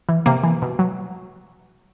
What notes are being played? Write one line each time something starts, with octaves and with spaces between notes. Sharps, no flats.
E3
C3 A#3
E3
B2
F#3